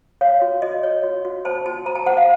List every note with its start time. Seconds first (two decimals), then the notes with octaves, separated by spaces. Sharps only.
0.21 C#5 F5
0.42 F#4
0.62 F#4 D#5
0.83 C#5
1.03 F#4
1.25 F#4
1.45 C5 A5
1.66 F#4 A5
1.86 C5 A#5
1.95 A5
2.06 C5 F#5
2.17 F5